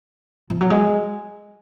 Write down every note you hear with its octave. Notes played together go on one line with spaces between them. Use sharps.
F3
F#3
G#3